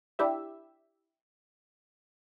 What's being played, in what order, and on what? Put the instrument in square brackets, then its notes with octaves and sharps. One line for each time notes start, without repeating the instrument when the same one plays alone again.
[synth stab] D4 E4 G4 E5